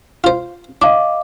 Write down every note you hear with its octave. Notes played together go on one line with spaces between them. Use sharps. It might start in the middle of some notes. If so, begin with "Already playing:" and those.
F4 C5
D4 D#5 F5 D6